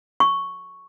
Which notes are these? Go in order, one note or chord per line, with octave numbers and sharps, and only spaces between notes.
C#6